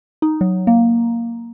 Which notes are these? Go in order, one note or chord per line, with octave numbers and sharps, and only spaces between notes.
D#4
F#3
A#3